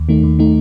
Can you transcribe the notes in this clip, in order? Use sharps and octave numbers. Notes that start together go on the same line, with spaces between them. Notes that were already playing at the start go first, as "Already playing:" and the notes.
Already playing: D#2
D#3 A3 D#4
D#2
D#3 A3 D#4